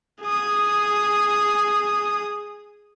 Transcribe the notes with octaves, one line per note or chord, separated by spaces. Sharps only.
G#4 D#6